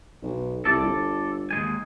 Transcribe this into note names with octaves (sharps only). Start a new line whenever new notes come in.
B1
C2 A4 D5
G1
D#2 G#3 G#5